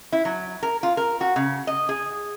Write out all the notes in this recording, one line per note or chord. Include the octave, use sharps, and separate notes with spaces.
E4
F#3
A#4
F4
A#4
F#4
C#3
D#5
G#4